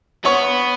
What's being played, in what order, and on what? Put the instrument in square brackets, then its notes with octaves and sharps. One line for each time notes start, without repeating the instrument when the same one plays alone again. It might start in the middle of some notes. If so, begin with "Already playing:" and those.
[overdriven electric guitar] B3 [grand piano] C#5 C#6